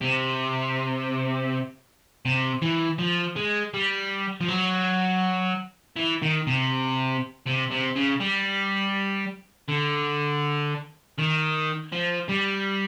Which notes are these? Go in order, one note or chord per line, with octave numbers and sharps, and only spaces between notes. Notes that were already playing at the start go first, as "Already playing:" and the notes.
C3
C3
E3
F3
G#3
G3
F3
F#3
E3
D#3
C3
C3
C3
C#3
G3
D3
D#3
F3
G3